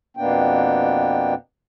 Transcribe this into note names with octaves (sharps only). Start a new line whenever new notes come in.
F2 B2 A#3 B3 D4 G5